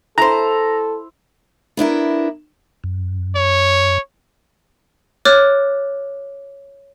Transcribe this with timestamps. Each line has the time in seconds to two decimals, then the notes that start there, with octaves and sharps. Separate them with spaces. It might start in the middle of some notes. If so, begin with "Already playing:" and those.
0.18 E4 A4 C5 A#5
1.77 B3 D4 E4 A#4
2.84 F#2
3.36 C#5
5.25 C#5 D6 F6 F#6 A6